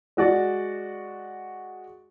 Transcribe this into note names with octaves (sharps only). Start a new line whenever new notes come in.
G#3 F#4 D5